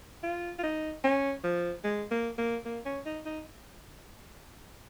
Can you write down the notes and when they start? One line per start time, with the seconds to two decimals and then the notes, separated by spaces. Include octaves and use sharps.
0.23 F4
0.59 F4
0.63 D#4
1.04 C#4
1.44 F3
1.84 G#3
2.11 A#3
2.38 A#3
2.65 A#3
2.85 C#4
3.06 D#4
3.25 D#4